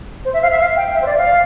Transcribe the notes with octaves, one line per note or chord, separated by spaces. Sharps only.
C5
E5
F5
E5
F5
G5
E5
C5
D5
F5